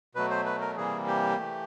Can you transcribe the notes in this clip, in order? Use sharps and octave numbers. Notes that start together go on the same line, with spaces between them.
B2 F#3 A3 B4
C5
B4
A#4
C3 E3 G3 A#3 G#4
G4
E3 A3